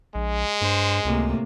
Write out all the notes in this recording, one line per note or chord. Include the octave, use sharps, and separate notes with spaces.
A#1 G#3
G2 C5
C#2 A2 C3 A#3